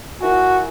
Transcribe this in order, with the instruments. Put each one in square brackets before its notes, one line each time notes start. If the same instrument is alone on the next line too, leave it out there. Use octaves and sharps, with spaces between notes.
[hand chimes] E4 A#4 E5 G#5 [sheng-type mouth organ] F#4